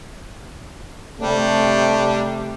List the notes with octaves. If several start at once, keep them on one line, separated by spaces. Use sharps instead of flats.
C3 G3 A3 D4